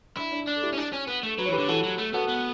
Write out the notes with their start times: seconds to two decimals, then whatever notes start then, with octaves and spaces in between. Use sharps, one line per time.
0.17 D4 E4
0.32 D4
0.47 D4
0.56 A4
0.62 E4 G4
0.73 C#4
0.78 D4
0.93 C#4
1.08 B3
1.23 A3
1.38 F#3 B4
1.46 C#5
1.49 E3
1.52 G4 B4
1.58 D3
1.68 E3 F#4 A4
1.84 F#3
1.98 A3
2.14 B3 F#4 A4
2.29 B3